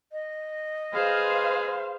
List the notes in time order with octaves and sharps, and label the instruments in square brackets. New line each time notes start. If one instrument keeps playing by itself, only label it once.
[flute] D#5
[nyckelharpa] G#4 B4 [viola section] C5 F5